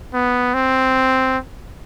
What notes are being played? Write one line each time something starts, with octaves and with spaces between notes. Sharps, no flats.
B3
C4